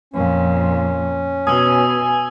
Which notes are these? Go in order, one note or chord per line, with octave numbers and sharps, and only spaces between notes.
F2 A#2 C#4
B2 G#5 D#6 E6